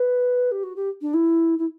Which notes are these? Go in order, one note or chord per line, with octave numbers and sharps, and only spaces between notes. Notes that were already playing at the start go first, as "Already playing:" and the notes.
Already playing: B4
G4
F#4
G4
D4
E4
E4